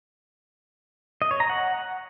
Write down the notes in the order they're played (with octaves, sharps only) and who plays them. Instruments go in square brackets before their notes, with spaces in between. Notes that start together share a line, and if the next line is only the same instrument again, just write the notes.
[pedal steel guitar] D#5
C#5
A#5
F#5